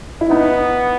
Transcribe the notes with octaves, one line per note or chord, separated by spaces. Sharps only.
E4
B3 D#4